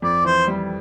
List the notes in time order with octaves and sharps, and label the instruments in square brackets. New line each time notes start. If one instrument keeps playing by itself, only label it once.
[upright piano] F2 [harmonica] D5
[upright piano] E3 [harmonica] C5
[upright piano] G3